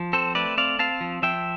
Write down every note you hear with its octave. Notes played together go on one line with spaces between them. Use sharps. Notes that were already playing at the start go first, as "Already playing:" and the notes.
Already playing: F3
C4 A4 C5
A3 B4 D5
C4 D5 F5
C4 F5 A5
F3
F3 E5 G5